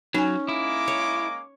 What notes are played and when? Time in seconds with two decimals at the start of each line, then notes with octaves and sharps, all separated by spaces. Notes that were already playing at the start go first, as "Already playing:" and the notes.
0.14 F#3 C#4 D#4 G#5
0.49 G#3 A#3 E4 D6
0.88 C#5